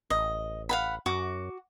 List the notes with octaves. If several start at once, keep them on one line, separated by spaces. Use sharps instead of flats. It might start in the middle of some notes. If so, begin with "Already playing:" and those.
A1 D#5
F5 F#5 B5
F#2 F#4 D6